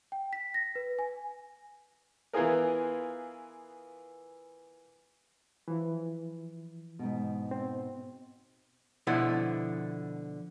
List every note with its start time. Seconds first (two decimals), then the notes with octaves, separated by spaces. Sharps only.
0.12 G5
0.33 B6
0.54 A#6
0.75 B4
0.99 G#5
2.33 E3 B3 F4 G#4 A#4
5.68 E3 F3
6.99 G#2 B2
7.51 C4
9.07 B2 D3 F3 E4